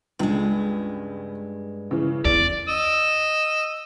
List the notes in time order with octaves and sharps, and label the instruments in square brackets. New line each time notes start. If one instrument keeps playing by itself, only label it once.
[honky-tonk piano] C#2 [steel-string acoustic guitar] G2 G#3
[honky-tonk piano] C#3 E3
[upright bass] E2 [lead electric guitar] D5
[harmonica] D#5 E6